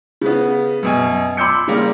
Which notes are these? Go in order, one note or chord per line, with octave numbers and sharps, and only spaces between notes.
C#3 B3
F#2 B2 G#5
B5 C6 D6 E6 G6 C#7
C#3 G3 A#3